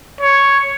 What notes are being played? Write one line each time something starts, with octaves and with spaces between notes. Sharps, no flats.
C#5